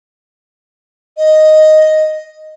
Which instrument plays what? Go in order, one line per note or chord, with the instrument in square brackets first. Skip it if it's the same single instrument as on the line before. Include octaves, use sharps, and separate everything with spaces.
[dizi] D#5